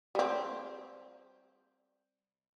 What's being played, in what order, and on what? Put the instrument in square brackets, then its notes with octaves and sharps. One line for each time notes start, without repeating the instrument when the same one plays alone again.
[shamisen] G3 C4